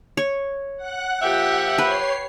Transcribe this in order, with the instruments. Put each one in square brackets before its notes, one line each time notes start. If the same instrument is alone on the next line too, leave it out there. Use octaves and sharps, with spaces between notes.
[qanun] C#5
[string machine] F#5 F#6
[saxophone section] A#2 F3 E5 [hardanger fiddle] G4
[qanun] B4 [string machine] C#5 C7